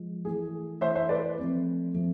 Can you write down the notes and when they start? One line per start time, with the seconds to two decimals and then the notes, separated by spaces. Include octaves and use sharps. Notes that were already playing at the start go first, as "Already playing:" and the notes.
Already playing: F3 G#3 F4
0.25 E3 A3 E4 G#4
0.81 E3 A3 E4 C5 E5
0.95 C5 E5
1.09 B4 D5
1.38 F3 A3 C4
1.94 F3 A3 C4